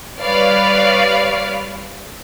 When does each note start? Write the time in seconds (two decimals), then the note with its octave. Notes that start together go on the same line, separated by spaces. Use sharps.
0.22 G3 B4 C#5 D5 F5